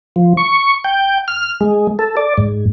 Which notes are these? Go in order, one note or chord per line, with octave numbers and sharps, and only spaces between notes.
F3
C#6
G5
F6
G#3
A4
D5
G#2